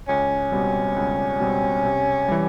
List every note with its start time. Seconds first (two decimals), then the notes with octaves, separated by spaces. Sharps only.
0.09 C#2 C#4
0.52 B2 G3 C4
0.96 C#2
1.40 B2 G3 C4
1.85 C3
2.28 E3 G3